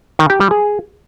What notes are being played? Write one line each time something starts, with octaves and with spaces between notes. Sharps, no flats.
D#3
G4
G3
G#4